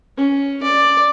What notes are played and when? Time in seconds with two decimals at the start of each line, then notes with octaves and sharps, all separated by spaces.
0.17 C#4
0.63 D5